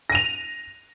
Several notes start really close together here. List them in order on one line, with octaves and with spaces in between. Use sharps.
A#6 D#7 F7